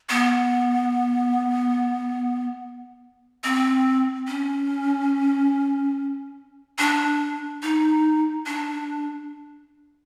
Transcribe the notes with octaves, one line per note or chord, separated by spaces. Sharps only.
B3
C4
C#4
D4
D#4
D4